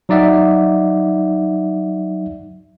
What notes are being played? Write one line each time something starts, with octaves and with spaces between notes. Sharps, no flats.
F#3 D#4 D5 E5 F#5